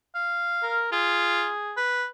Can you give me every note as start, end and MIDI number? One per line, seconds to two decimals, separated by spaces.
0.15 0.80 77
0.63 0.90 70
0.92 1.49 65
0.92 1.76 68
1.77 2.06 71